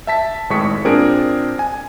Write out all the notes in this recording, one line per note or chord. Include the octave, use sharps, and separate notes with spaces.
E5 A5 B6
G#1 A2 G#3 C#6 B6 C#7
A#2 C4 D4 G#4 A#4 D7
G#5